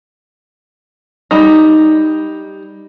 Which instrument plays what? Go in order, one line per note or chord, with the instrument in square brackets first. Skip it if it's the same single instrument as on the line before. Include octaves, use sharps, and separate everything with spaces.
[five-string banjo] G3 D#4